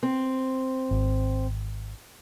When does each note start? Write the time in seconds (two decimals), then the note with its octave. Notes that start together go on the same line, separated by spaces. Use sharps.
0.03 C4
0.91 G#1